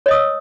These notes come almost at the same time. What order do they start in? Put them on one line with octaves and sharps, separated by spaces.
C#5 D#5 D#6 E6